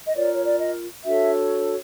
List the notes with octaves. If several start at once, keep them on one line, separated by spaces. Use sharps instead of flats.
D#5
F4 A#4 C#5 D5
C#5
D5
D#5
D4 F#4 A4 C#5 E5